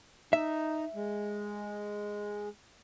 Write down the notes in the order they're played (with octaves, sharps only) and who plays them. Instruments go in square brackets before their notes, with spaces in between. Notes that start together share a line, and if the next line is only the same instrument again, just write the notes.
[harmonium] D#4 [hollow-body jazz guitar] E5
[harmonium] G#3